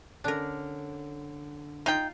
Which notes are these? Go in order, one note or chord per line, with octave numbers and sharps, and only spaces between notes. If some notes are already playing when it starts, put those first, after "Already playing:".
D3 C#4 D4 A#4
D#4 F4 F5 G5